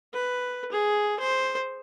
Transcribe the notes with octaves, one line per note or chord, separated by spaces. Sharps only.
B4
G#4
C5